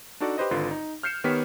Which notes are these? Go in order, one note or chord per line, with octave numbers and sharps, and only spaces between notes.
D4 D#4 F#4 A4 D5
G4 B4 C5 D#5
G#1 D3 F4 B4 C6
D#4
F6 G6 C7 C#7 E7
D#3 B3 G4 C#5 B6